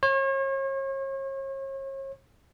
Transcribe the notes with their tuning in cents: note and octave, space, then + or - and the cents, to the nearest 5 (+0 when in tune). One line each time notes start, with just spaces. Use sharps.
C#5 -40